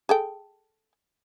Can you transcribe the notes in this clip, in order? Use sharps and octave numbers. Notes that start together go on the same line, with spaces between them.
G#4 A4 G5